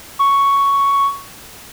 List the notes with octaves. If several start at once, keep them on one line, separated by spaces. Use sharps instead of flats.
C#6